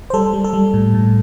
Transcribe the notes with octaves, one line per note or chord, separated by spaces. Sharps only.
C5
G3 A4
G3
A4
G3
A2
A2